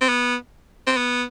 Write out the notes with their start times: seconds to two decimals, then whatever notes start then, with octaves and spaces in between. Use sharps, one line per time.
0.01 C4
0.09 B3
0.87 C4
0.97 B3